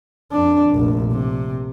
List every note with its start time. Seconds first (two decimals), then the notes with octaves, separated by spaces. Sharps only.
0.32 F2 D4
0.70 F1 A#1
1.12 C3